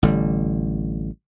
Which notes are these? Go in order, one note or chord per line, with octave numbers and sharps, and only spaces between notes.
A1 D3 G3